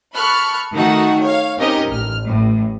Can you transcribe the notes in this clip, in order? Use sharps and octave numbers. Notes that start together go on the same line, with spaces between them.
A4 B5 C#6 F6 F#6
D#3 A3 D#4 F#4 F#5
C#5 F5
C4 C#4 D#4 G4 A#4 D#5
A1 F6
A1 A2